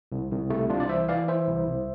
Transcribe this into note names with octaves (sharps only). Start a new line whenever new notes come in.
C2
C2
C3 A3
C2 D4 F4
D5
E3 C5 E5
E3 D5 F5
E3 C5 E5
C2
C2